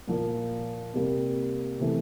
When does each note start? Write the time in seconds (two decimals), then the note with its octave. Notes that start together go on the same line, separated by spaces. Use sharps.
0.08 A#2 F3 A#3
0.94 C3 G3 A#3
1.79 C3 E3 A3